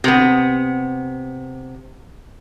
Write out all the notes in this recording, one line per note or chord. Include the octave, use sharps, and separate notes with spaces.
C3 B3